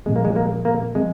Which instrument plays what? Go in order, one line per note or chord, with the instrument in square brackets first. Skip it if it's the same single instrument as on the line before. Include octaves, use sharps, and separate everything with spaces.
[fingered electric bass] A#2 F3 C4 [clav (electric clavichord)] G#3
[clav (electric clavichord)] A#3
G#3
A#3
A#3
[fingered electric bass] F3 C4 [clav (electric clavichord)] G#3